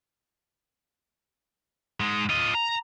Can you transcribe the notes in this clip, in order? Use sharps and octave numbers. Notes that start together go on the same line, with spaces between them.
G#2 G#3
F4 D#5
A#5